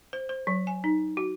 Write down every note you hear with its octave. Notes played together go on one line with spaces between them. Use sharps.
C5
C5
F#3
G#5
D#4
F#4